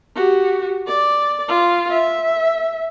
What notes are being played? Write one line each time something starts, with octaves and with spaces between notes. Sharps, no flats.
F#4 G4
D5
F4
E5